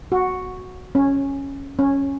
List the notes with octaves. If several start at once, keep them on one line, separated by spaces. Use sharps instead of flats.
F#4
C#4
C#4